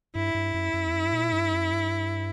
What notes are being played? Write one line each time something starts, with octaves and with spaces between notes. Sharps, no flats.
G2 E4
G2
F#2
F#2
E2
F#2
G2
A#2
G2
F#2
G2